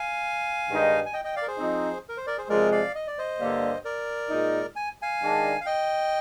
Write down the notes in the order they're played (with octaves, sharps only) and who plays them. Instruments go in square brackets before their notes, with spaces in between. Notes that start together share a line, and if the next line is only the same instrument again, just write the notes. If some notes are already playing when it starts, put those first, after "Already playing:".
Already playing: [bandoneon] F5 G#5
[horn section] G2 D#3 G#3 D#4
[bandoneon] G#5
D#5 G5
D#5 G5
D5 F5
A#4
G#4 C5
[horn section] F3 C4 D#4
[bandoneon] A#4
C5
A#4 D5
G#4 C5
[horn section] C3 F3 G#3 [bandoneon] A#4 D5
[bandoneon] D5 F5
D#5
D5
C5 D#5
[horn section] G2 D3 G3 A#3
[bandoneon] A#4 D5
[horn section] A#2 G#3 D#4
[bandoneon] G#5
F5 G#5
[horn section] D#3 G#3 D4
[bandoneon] F5
D#5 G5